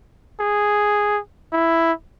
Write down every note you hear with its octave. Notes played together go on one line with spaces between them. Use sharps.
G#4
E4